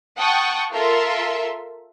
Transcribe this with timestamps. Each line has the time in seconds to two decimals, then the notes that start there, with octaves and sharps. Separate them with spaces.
0.16 F#5 G5 A5 C#6 D#6
0.71 F4 A4 A#4 E5 C6